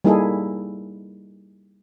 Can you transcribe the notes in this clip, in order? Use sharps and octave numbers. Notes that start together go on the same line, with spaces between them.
G3 A#3 D#4 E4 G#4 A4